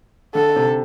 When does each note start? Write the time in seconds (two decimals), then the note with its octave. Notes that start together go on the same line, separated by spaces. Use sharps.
0.35 D3 A4
0.56 C3